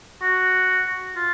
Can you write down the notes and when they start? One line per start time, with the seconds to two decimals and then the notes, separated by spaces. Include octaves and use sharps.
0.22 F#4
1.16 F4